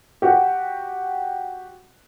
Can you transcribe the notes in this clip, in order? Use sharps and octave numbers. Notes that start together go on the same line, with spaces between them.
F#4 G4